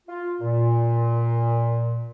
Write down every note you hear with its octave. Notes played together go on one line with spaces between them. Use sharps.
F4
A#2